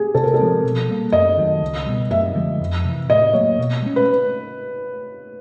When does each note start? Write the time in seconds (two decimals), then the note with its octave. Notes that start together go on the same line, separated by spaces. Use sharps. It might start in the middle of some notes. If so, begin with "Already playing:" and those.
Already playing: G4 G#4
0.14 C3 A4
0.23 A#4
0.34 A4
0.39 F3 G#3 C4
0.64 B2
0.88 G3 A#3
1.12 F#2 D#5
1.38 D#3 F#3
1.61 C#2
1.86 B2 G3
2.10 F#2 E5
2.35 D3 F3 G#3
2.60 F2
2.85 C3 E3
3.08 A2 D#5
3.33 F#3 A#3 C#5
3.59 B2
3.82 G#3 C#4
3.96 B4